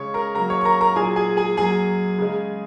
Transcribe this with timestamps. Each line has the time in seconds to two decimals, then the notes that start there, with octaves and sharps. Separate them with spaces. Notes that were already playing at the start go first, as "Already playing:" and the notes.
Already playing: C#3 G#3 C#5 C#6
0.14 A#4 A#5
0.35 C#3 F#3 A#3 A#4 A#5
0.50 C#5 C#6
0.61 C#6
0.65 A#4 A#5
0.81 A#4 A#5
0.96 A#2 F#3 A#3 G#4 G#5
1.16 G#4 G#5
1.37 G#4 G#5
1.57 F#2 F#3 A#3 G#4 G#5
2.19 C#3 G#3